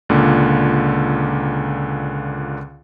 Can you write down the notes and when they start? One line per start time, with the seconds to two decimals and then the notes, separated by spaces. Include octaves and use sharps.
0.09 C#2 A#2 D3